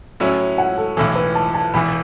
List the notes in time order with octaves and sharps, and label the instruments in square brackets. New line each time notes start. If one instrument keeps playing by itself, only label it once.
[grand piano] A2 F#3 C#4 E4
[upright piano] F#5
A4
[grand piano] B1 A2 E3 [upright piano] A4
[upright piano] B4
A5
A5
[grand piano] E1 E2 E3 [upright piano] B5